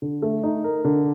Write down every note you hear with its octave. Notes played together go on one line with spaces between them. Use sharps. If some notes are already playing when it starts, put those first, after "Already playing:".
D3
A3
D#4
A#4
D3